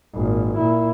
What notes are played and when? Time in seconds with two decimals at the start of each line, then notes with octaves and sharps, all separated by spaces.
0.14 G#1 A#2
0.57 A#2 E4